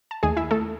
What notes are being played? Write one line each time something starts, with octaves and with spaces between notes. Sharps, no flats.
A5
D#2 D#3 A3 G#4 G#5
E4 E5
A3 A4